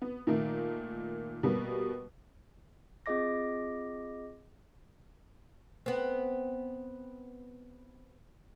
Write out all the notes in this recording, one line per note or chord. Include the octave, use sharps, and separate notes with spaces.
B3
A#2 D#3 A3 A#3
B2 G3 A#3 B3
C4 F4 G#4 D#5 D6 A#6
B3 C4